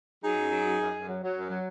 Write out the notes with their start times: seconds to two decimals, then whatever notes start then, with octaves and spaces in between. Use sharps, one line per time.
0.23 F#3 D#4 G#4
0.37 F#2
0.51 F#3
0.65 F#2
0.80 F#2
0.94 F#2
1.08 F#3
1.22 F#3
1.35 F#2
1.50 F#3